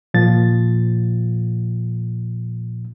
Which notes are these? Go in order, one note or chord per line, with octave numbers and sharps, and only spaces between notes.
A#2 F3 A6